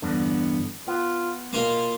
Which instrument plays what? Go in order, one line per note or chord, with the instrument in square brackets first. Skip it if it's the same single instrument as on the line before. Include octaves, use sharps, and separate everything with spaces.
[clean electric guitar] E2 G2 D3 [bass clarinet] B3
[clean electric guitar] B3 [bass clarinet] F4
[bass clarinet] B2 [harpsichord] A#3 F4